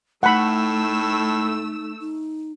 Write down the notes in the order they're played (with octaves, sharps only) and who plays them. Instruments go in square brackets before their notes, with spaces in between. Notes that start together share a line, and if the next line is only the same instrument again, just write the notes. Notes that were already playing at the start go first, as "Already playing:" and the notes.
[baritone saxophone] A2 [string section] A3 E6 [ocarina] D#4 [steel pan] F#5 B5
[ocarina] D#4